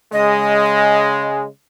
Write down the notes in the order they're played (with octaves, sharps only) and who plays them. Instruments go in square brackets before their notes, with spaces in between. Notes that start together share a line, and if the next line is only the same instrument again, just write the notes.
[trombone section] C#3 G#3 [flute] D#5